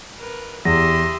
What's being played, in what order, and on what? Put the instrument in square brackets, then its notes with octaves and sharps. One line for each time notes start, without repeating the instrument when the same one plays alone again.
[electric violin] A#4 B4
[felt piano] E2 [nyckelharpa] G4 E5 [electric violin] C6 D#6 [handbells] A#6